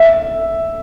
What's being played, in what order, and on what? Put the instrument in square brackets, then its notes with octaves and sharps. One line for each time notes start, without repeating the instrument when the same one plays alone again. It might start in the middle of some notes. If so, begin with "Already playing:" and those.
Already playing: [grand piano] E5